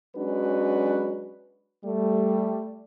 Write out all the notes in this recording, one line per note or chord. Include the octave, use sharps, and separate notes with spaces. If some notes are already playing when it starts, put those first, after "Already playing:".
F#3 G#3 C#4 D4 F#4 B4
G3 A3